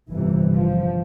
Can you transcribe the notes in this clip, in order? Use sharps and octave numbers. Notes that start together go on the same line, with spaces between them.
G1 F2 C3 E3
F3